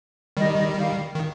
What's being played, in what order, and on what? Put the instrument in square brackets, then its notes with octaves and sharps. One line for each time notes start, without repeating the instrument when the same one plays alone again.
[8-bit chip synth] D#3 G3 [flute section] D#5
[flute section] D#5
F5
[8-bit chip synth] D#3